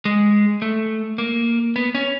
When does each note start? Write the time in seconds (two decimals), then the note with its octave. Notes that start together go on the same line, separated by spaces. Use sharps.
0.05 G#3
0.62 A3
1.18 A#3
1.76 B3
1.95 C#4